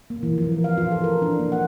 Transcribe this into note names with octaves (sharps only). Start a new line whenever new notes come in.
A#3
E3
F3
A#4
F5
F4
A4
A#4
D4
A#3
F#5